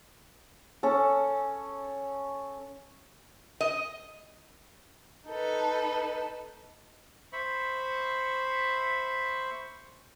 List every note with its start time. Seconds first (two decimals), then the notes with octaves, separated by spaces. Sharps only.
0.83 C#4 A4
3.61 D#5
5.28 D#4 A4 B4
7.32 C5 E5 B5 C#6